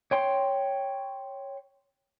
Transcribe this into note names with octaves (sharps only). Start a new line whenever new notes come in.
C#5 G5 C6